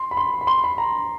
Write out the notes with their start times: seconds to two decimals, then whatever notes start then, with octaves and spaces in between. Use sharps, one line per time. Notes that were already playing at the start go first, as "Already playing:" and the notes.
Already playing: C6
0.11 B5
0.17 C6
0.41 B5
0.47 C6
0.64 B5
0.78 A#5